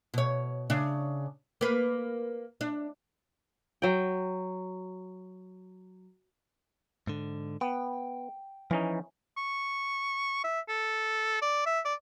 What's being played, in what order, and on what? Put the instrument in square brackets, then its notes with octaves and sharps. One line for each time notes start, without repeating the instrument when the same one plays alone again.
[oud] B2 C#5
C#3 D4
A#3 B4
D4
[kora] F#3 G5
[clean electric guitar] G#2 D3
[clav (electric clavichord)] B3 [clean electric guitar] G5
[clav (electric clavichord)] E3 C#4 D#4 [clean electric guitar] F3
[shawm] C#6
E5
A4
D5
E5
D5